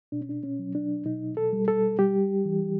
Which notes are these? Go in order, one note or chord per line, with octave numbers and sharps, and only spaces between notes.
B2 D4
C#4
D4
C#4
F#3
D4
B2 D#4
A4
G3
A4
G3 G4
E3